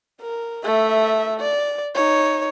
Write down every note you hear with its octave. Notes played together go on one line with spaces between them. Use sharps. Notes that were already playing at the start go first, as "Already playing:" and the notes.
A#4
A3 E5
D5
D#4 C#5